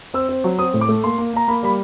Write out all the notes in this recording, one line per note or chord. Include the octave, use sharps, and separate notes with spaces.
C4 E6
C4
F#3
C4 D#6
A2
D6
A3
A#3 C6
A#3
A#3 A#5
A#3 B5
G3 B5